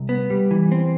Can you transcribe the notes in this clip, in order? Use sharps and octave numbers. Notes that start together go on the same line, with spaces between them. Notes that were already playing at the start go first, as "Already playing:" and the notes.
Already playing: C2
B3
G3
E3
C4